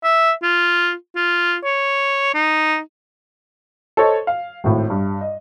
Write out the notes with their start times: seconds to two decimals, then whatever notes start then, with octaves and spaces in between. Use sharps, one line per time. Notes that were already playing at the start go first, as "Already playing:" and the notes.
0.04 E5
0.42 F4
1.16 F4
1.64 C#5
2.34 D#4
3.97 A4 C5 C#5 D#5
4.27 F5
4.64 G#1 A2
4.90 G2
5.21 D#5